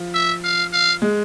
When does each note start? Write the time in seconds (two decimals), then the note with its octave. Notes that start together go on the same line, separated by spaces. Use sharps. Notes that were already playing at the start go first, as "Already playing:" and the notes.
Already playing: F3
0.15 E5
0.44 F5
0.73 F5
1.02 G#3